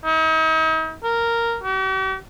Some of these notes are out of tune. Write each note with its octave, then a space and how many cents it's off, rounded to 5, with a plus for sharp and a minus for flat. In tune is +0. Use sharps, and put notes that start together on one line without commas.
D#4 +40
A#4 -5
G4 -45